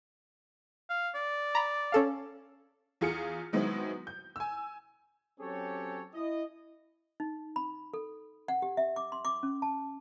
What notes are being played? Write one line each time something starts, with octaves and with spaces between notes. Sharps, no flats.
F5
D5
A#5 B5
C#4 A4 F5
E2 F4 G#4 F6 C#7
D#3 F#3 G#3 B3 C4 E4
G6
G#5 E6
F#3 C4 C#4 G4 A4 C#5
E4 D#5
D#4
B5
A4
F#5
G4
E5
D6
C6
D6
C#4
A5